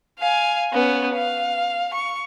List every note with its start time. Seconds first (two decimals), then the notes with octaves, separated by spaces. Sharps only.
0.19 F5 G#5
0.73 B3 C#4
1.15 F5
1.94 C#6